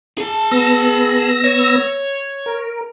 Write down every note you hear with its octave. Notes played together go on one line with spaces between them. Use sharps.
G#4 A5
B3 E6 A#6
C#5
A#4